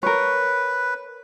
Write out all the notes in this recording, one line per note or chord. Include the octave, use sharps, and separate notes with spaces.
A#4 B4 C#5